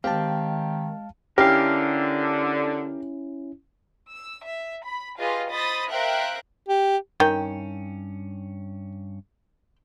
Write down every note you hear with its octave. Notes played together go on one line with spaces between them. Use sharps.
D#3 G#3 C4 G4 F5 A5
D3 C#4 E4 G4 A#4 F5
E6
E5
B5
F4 G4 G#4 B4 D#5 F5
C5 D#5 B5 D#6 A6
A#4 C5 E5 F5 G5 F#6
G4
G2 D#3 C#4 G5